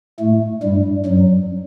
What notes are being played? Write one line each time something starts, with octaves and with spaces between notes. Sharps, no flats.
A2 A3
G2 G3
F#2 F#3